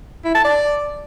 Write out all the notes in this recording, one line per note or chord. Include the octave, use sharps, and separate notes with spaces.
E4
A5
D5